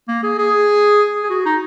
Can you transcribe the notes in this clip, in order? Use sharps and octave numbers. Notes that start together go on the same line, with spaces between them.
A#3
G#4
G#4
G#4
F#4
D#4